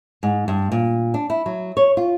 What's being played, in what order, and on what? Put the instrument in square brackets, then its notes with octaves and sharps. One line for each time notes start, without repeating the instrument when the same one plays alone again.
[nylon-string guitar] G#2
G2
A#2
D4
E4
F#3
C#5
F4